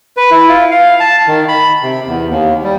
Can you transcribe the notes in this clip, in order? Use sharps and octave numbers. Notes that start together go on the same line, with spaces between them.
B4
E4
F4
F5
A5
D#3
B5
C3
E2
D#2
G3